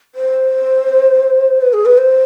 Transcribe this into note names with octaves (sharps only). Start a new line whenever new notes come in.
C5
B4
G#4
B4
C5